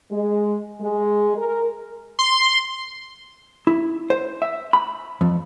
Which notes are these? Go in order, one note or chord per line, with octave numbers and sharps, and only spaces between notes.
G#3
G#3
A#4
C6
E4
C5
E5
B5
F2